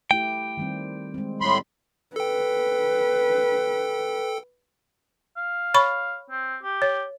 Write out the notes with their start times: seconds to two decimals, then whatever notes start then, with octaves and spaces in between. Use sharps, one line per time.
0.11 A3 E4 G4 G5
0.57 D#3 G3 C4
1.14 G#3 C4
1.41 A2 G3 B5 C6
2.16 A4 B4 G5
5.37 F5
5.74 C#5 B5 C#6
6.30 C4
6.63 G4
6.82 C#5